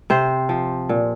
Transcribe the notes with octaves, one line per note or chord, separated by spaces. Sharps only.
C3 C5
F3
A#2